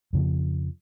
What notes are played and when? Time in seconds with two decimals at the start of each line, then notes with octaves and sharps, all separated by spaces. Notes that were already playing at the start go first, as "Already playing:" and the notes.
0.13 F2 C#3 F3